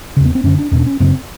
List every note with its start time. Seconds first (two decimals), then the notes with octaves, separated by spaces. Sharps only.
0.17 E2 C#3
0.25 B3
0.35 C4
0.44 F#2 D3 C#4
0.58 D4
0.72 E2 B2 C#4
0.79 D4
0.86 C#4
1.00 F#2 C#3 C4